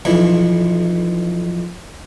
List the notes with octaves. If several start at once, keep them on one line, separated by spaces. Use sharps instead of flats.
B1 F2 E3